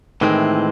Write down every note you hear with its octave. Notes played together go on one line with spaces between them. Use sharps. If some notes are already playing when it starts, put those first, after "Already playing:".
A2 D#3 E3 G#3 C4